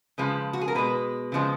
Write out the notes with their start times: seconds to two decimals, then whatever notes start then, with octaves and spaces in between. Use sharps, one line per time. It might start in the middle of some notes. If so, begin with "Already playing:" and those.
0.18 C#3 F3 G#3 B4
0.53 F#4
0.61 G#4
0.68 A#4
0.75 B2 G#3 B4
1.32 C#3 F3 G#3